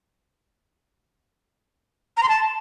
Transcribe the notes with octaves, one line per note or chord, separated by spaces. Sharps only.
A#5
C6
A5